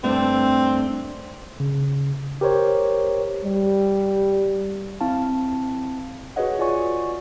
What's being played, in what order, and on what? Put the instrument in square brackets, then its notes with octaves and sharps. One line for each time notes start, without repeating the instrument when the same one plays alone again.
[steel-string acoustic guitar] G2 A3 D4 [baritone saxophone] C4
[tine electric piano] C#3
G4 A#4 C5 C#5
[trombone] G3
[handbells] C4 E4 F5 A5
F#4 G#4 B4 C#5 D#5 F#5
F4 D5 G#5 C#6